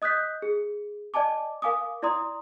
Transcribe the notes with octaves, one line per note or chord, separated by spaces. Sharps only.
D#5 D#6 F#6 G6 B6
G#4
D5 D#5 G#5 A5 D6
A#4 F5 G#5 D6 D#6
E4 D5 A#5 C6 D#6